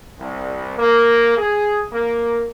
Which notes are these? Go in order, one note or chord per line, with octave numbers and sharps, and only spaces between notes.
C2
A#3
G#4
A#3